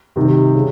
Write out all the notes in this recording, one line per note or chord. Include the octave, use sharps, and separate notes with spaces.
C3 D#3 G3
C#3